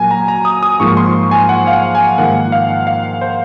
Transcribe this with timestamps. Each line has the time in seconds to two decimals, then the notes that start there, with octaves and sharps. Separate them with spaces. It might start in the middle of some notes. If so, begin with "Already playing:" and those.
Already playing: A#2 F#3 A#3 G#5
0.11 A#5
0.28 A#5
0.45 D#6
0.63 D#6
0.80 G#2 F3 A#3 F4 C#6
0.97 C6
1.31 G#5
1.49 F#5
1.67 F5
1.72 F#5
1.95 G#5
2.18 G#2 D#3 A#3 F4 F#5
2.52 F5
2.87 F5
3.21 C5